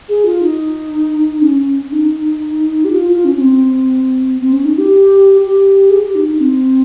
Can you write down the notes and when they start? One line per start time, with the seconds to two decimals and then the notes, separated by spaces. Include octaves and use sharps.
0.09 G#4
0.26 F4
0.42 D#4
1.42 C#4
1.92 D#4
2.85 G4
2.92 F4
3.08 F4
3.25 C#4
3.36 C#4
3.41 C4
4.41 C4
4.53 C#4
4.65 D#4
4.78 G4
5.41 G4
5.90 G#4
6.02 G4
6.15 D#4
6.27 D#4
6.40 C4